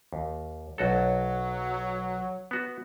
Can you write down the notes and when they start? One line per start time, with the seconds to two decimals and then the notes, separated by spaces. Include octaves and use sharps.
0.13 D#2
0.78 B1 F#3 F#4 A4
2.51 B3 F#4